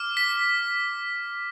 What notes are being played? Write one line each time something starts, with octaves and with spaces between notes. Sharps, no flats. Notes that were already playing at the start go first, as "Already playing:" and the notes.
Already playing: D6 F6
B6